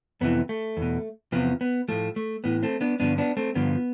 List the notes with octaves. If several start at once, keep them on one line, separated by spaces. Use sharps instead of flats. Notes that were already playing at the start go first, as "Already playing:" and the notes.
F2 C3 E3 B3
A3
E2
B2
E2 C3 F3 B3
B3
A2 F3 A3
A3
A2 E3 B3
A3 C4
B3 D4
G2 D3 F3 B3 D4
B3 D4
A3 C4
G2 D3 F3 B3